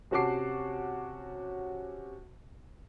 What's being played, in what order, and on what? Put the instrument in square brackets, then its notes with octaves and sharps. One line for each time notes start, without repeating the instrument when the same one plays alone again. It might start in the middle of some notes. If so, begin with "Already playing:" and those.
[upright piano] C3 C#4 F#4 A5 D6 C7